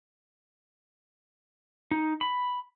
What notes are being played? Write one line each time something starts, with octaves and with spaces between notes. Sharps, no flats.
D#4
B5